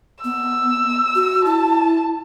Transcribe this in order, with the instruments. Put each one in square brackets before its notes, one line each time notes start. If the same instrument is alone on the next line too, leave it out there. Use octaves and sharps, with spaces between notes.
[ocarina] B3 [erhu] E6
[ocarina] F#4
[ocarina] E4 [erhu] A5